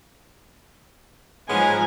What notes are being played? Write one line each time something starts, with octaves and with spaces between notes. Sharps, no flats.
G#2 F3 G#3 B3 C#4 G#5 A#5